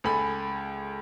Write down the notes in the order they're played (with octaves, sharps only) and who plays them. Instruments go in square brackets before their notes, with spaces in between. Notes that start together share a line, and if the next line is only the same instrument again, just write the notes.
[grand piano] C#2 A4 G#5 B5